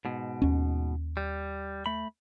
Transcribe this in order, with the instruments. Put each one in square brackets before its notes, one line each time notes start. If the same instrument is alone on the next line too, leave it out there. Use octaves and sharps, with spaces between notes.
[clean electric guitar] G#2 B2
[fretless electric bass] D#2 C#4
[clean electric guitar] G3
A3 B5